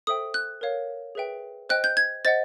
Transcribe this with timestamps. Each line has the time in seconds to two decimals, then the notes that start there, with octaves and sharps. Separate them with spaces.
0.07 A4 C5 E5 G5 D#6
0.34 F#6
0.61 A#4 C#5 F5
1.15 G#4 B4 E5 G5
1.69 C5 D#5 G5 F#6
1.84 G6
1.97 G#6
2.25 C5 D#5 F#5 A6